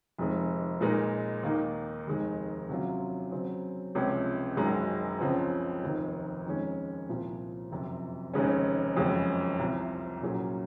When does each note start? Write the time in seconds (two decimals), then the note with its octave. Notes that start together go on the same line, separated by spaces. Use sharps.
0.19 F1 F2 D#3 G#3
0.81 A#2 G#3 D#4 A#4
1.43 D#2 D#3 A#3 D#4
2.07 F1 D#2 D#3 G#3 D#4
2.69 C3 F#3 C#4 F4
3.31 C#3 F#3 C4
3.95 C#2 C3 F3 G#3 C#4
4.57 F#1 F#2 D#3 G#3 D#4
5.20 C#2 C#3 F3 C4
5.82 F1 D#2 D#3
6.46 F2 D#3 G#3 C#4
7.09 C2 A#2 F3 C4
7.72 F#1 F2 C3
8.33 F1 D#2 C#3 G#3 C#4
8.96 F#1 F2 C#3 G#3
9.59 C2 C3 F3
10.22 C2 A#2 F#3 C#4 G#4